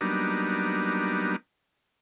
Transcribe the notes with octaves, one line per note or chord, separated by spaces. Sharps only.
F#3 G3 A#3 B3 D4 D#4